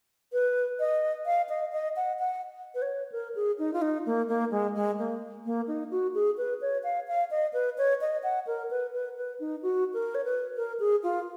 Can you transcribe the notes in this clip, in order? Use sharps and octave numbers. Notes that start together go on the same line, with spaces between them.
B4
D#5
F5
D#5
D#5
F#5
F#5
B4
C#5
A#4
G#4
D#4
F4
D#4
A#3
A#3
G#3
G#3
A#3
A#3
D#4
F#4
G#4
B4
C#5
F5
F5
D#5
B4
C#5
D#5
F#5
A#4
B4
B4
B4
D#4
F#4
A#4
C#5
B4
A#4
G#4
F4